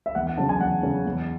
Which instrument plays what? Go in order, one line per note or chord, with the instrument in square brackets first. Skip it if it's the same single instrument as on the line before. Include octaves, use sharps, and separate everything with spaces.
[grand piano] E5
E2 F#5
F#5
C#3 F#3 C#4 A5
G#5
E2 F#5
C#3 F#3 C#4
E2